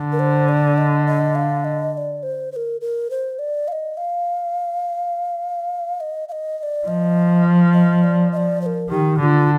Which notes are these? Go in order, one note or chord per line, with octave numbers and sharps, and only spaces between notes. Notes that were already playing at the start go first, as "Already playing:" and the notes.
Already playing: D3
A#4
C5
D5
D#5
D#5
F5
D#5
D#5
D5
C5
C5
A#4
A#4
C5
D5
F5
D#5
F5
D#5
F5
D#5
D#5
D5
F3 D#5
D#5
D5
D#5
D5
C5
A#4
D#3 G4
D3 F4 G4